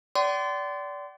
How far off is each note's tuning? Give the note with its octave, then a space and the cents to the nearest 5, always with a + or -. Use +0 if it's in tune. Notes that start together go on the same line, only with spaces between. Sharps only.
D5 -20 G5 -45 C6 -25